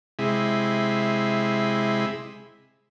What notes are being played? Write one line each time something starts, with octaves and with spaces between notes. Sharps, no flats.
C3 G#3 E4